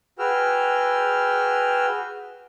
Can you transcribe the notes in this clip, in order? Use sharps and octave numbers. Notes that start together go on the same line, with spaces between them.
F#4 G#4 B4 G5 E6 F6